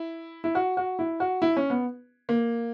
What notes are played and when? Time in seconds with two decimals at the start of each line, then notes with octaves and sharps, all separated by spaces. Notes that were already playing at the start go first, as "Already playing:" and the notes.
Already playing: E4
0.44 E4
0.55 F#4
0.77 F#4
0.99 E4
1.20 F#4
1.42 E4
1.57 C#4
1.70 B3
2.29 A#3